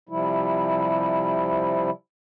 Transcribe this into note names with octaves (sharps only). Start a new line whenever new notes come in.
C3 F3 G3 E4